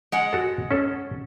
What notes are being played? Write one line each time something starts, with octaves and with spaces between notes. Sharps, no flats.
G#3 F#5
F#4 A4
C#4 A4